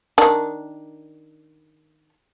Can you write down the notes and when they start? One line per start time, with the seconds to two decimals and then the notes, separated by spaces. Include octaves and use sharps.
0.18 D#3 D4